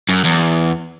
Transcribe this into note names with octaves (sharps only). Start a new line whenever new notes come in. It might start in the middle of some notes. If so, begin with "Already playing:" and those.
F#2
E2